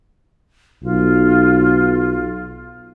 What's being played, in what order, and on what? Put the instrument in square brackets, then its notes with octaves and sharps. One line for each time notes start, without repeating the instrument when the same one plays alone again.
[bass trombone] B1 [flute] F4